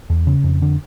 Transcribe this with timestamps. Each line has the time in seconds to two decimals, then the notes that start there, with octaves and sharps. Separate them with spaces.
0.10 E2
0.27 C#3
0.44 F2
0.62 D3